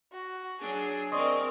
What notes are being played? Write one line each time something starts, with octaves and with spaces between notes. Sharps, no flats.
F#4
F#3 D4 G#4
C4 A#4 D5 D#5 C6 C#6